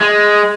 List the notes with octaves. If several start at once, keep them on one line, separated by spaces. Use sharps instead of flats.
G#3